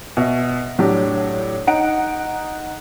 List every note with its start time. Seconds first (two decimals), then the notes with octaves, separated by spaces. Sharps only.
0.17 B2 E5
0.79 A2 F#3 D4 G4
1.67 D#4 F#5 D7